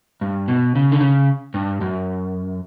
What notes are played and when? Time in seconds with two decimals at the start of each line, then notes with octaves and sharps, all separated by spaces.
0.21 G2
0.48 B2
0.75 C#3
0.92 D3
1.01 C#3
1.54 G2
1.81 F#2